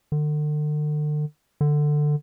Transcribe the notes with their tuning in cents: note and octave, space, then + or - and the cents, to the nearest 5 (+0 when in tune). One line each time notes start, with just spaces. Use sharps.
D3 +40
D3 +15